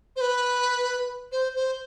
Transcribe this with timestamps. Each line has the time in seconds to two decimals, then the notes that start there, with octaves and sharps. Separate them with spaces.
0.16 C5
0.21 B4
1.32 C5
1.55 C5